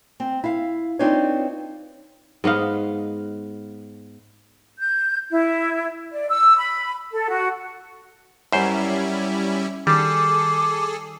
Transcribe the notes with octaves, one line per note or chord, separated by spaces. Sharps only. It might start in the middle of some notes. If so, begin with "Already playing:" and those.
C4
E4 F5
C4 D4 D#4 F4 B4 C#5
G#2 B3 D#5 F5
G6
E4
D5
E6
B5
A4
F#4
F#2 G3 C#4 E4 C5
D#3 G3 G#4 A4 D6 C7